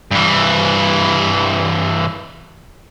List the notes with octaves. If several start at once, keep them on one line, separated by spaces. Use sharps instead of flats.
G2 E3